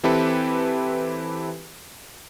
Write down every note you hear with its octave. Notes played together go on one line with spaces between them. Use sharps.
E3 C4 E4 G4 A4 B4